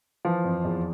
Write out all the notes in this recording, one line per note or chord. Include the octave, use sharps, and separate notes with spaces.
E3 F3 F4
F2
E2